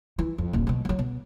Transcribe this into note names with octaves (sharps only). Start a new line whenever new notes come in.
E3
F2
D#1 A#1
B2 F#3
F3 F#3
B2